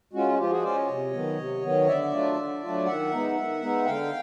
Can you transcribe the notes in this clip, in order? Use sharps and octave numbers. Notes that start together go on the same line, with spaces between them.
G#3 C#4 F4 F#4
F#4
F3 F4 G4
F#4 G#4
G#3 C#4 F4 C5 D5
C#5 D#5
C3
D#3 F#3 B3
C3
D#3 F#3 B3
D3 D5 E5
F#3 A3 D4 F4
D3
F#3 A3 D4 F4
D#3 E5 F#5
G#3 B3 D#4
D#3
G#3 B3 D#4
D3 F5 G5